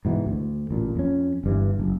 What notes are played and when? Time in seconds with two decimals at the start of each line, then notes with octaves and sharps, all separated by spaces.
0.05 G#2 B2 E3
0.26 D2
0.71 A1 A#2
0.96 F2 C#4
1.44 G1 G2 E3
1.80 F#1